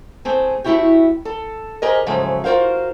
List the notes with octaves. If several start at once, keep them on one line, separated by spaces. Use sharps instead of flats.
A3 C4 G#4
A3 C4 C#4 E4 F#4 G4
A4
G4 G#4 A#4 C5 D#5
G#2 C#3 F3 F#3 G#3 A3
F4 F#4 A#4 C5 F5